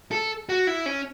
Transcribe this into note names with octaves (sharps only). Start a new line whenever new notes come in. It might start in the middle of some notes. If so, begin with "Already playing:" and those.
A4
F#4
E4
C#4